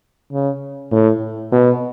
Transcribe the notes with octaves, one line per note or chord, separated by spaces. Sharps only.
C#3
A2
B2